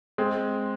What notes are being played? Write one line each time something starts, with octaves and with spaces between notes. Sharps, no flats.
G#3 C4